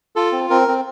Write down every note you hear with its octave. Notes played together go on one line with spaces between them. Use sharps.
F4 A4
C4
C4 A#4
C4